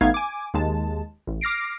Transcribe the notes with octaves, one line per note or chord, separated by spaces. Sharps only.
A1 A3 B3 D#4 F5 G#6
G#5 D6
D#2 G#3 A5
A1
D6 F6 A#6 C7 D7